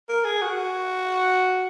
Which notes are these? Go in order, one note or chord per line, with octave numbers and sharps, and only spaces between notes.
A#4
G#4
F#4